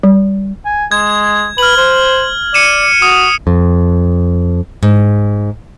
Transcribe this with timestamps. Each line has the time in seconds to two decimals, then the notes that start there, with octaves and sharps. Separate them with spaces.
0.03 G3
0.66 G#5
0.91 G#3 G#6
1.58 B4 F6 F#7
1.77 C5
2.54 D5 C#7 D#7 E7
3.02 F#4 D#6
3.47 F2
4.83 G#2